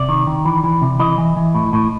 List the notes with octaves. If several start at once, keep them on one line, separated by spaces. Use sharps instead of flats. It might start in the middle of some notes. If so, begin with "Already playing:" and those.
Already playing: C3 D5
D#3
D#3
E3
E3
C3
E3 D#5
E3
E3
A2
A2